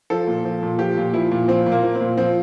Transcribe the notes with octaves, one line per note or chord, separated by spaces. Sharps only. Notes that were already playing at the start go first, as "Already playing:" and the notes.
F3 A4
A#2
F3
A#2
F3 G4
A#2
F3 E4
A#2
F3 C4
A#2
A#3
F3
C4
A#2
F3 C4